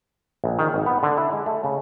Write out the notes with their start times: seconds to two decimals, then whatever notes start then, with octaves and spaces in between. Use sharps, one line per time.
0.44 A#1
0.59 D#3
0.74 G#1
0.86 B3
1.03 D3
1.18 E4
1.33 G#3
1.46 A3
1.64 C#3